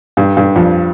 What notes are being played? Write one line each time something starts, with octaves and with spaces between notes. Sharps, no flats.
G2
G2
F2